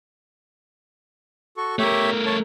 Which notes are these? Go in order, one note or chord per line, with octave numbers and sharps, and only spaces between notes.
F#4 A4 C#6
A3 G4 A#4 C#5 E5
C#5 A5